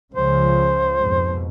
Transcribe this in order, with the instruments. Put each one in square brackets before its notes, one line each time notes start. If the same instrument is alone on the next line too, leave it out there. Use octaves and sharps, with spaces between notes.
[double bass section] C#2 C#3 F3 [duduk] C5
[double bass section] F2 G#2 B2